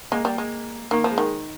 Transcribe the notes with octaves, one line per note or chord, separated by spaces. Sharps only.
G#3 A#3
G3
G#3
D#3 A#3
F3
G#3
D#3